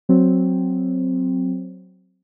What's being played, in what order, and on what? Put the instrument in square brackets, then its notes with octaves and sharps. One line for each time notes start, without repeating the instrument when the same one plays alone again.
[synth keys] F#3 C4